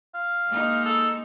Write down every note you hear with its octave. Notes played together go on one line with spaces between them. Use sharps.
F5
G#3 A#3 D#4
A4